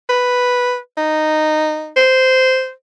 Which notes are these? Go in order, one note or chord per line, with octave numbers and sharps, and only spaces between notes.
B4
D#4
C5